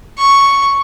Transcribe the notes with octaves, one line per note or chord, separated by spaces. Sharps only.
C#6